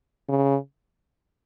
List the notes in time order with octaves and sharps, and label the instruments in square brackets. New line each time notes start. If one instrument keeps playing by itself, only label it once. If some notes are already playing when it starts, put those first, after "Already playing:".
[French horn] C#3